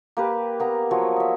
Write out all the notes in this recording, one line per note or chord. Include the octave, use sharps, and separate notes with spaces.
A#3 G4 B4
A#3 B3 A#5
F3 F#3 C#5
D#5 E5